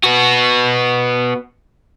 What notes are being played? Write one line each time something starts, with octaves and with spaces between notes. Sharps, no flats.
B3 F#4